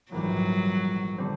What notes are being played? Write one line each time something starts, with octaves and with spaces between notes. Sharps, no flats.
A#1 G#2 E3 F#3 G3
D3 G3 C4